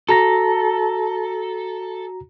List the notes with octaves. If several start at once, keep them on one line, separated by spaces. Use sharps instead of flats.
F#4 A4 A#5 A#6